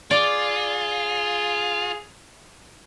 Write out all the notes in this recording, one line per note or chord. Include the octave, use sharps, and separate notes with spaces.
F4 G#4 D5